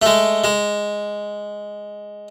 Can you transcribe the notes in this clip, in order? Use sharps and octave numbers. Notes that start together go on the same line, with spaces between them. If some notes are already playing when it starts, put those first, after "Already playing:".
G#3 A3
G#3